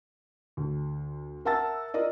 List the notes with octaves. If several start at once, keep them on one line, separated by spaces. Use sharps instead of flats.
D2
A#4 E5 F#5 A5 E6 A6
F4 A#4 D5 D#5